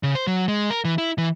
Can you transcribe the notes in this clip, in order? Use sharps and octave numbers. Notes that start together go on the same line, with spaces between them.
C#3
C5
F#3
G#3
A#4
E3
E4
E3